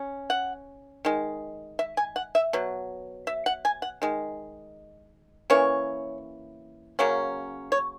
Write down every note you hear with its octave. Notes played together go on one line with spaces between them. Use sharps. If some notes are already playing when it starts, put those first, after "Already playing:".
Already playing: C#4
F#5
D#3 G#3
E5
G#5
F#5
E5
B2 F#3
E5
F#5
G#5
F#5
D#3 G#3
E3 A#3 C#4 C#5
C#3 F#3 A#3 C#4
C#5